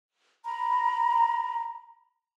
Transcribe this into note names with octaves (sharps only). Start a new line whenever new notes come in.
A#5 B5